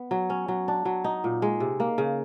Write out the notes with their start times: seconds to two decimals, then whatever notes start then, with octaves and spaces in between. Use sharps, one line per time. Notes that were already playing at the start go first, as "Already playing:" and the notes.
Already playing: B3
0.11 F#3
0.30 C#4
0.48 F#3
0.68 D4
0.85 F#3
1.04 D#4
1.24 A#2
1.42 G#3
1.60 C3
1.80 A#3
1.98 C#3